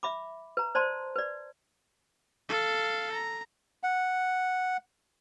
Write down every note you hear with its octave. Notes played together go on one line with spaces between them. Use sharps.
E5 B5 D6
B4 A#5
C5 D5 A5 C6
B4 D5
A4 F5
A#5
F#5